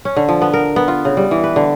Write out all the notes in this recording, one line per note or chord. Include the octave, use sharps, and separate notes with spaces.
C#4
D3
F3
B3
A#4
B3
F4
C#3
G3
E3
B4
D3